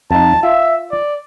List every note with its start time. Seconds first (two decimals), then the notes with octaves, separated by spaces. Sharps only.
0.11 F2 D#4 A5
0.43 F4 E5
0.91 D5